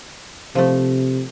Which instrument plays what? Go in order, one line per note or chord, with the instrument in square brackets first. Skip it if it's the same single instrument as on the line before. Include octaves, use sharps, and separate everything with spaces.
[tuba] C3 [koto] F3 A3